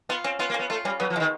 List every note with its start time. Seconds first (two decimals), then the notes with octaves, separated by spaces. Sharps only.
0.09 B3 F4
0.24 C4 C#4
0.39 B3 F4
0.50 A#3
0.54 C#4
0.59 B3
0.70 A3 F4
0.85 G3 C#4
1.00 F#3 B3
1.10 F3
1.16 E3 G#3
1.20 D#3